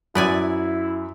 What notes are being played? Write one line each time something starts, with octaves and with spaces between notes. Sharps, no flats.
F#2 B3 E4 D5 G#5